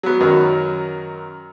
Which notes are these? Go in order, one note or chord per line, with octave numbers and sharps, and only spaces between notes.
F#3 B3
F#2 D#3 F#3